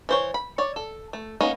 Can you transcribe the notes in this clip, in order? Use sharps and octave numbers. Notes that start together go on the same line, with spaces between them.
E3 C5 C#5
B5
C#5 D5
A4
A3
A#3 B3 C#4 D#4